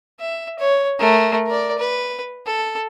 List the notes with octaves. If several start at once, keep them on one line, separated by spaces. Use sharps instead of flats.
E5
C#5
A3 A#4
A#4 D5
B4
A4